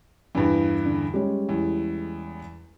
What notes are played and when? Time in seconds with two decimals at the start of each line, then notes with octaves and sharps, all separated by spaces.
0.35 E2 G2 D4 B4
0.85 D3
1.14 G3 G#3 C#4
1.49 E2